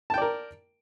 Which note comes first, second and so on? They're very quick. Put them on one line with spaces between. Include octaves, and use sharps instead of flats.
A5 G5 D5 A#4